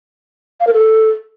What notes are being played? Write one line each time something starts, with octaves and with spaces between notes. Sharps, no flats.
F5
A#4
A4